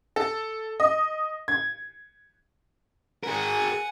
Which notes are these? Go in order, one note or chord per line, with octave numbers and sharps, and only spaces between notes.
A4
D#5
G#6
G#4 A#4 F#5 G#5